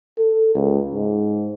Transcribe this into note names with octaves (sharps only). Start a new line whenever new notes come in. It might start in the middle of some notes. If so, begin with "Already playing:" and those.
A4
C#2
G#2